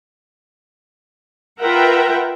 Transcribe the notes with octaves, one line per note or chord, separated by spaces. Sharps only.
F4 A#4 B4 E5 F#5 G5